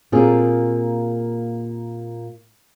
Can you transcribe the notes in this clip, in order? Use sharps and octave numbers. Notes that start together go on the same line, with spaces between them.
A#2 A#3 C4 F4 G4 G#4